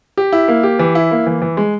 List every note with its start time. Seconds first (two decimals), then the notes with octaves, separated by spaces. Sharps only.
0.17 G4
0.32 E4
0.48 A#3
0.63 G4
0.79 E3
0.95 E4
1.11 A#3
1.27 E3
1.42 E3
1.57 G#3